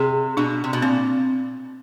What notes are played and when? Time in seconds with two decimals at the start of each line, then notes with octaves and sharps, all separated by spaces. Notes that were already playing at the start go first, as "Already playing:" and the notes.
Already playing: C3 G#4
0.37 B2 D4
0.64 C3
0.73 B2
0.82 A#2 C4